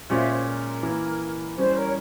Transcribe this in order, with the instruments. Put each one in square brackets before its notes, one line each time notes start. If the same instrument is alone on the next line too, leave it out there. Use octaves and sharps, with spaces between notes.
[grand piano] A#2 G#3 C#4 F4 [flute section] C5 E5
[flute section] C5
A#4
[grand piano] E3 A#3 E4
[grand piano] E3 G3 C#4 E4 [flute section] C5
[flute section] A#4 C#5